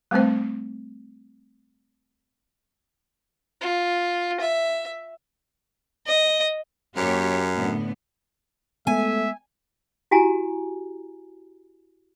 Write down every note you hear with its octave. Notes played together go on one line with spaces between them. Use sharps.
G3 A3 C4 C5
F4
E5
D#5
F#2 A#3 G4 C#5
A2 D3 B3
G#3 A3 B3 E5 G#5
E4 F#4 G4 G#5 A#5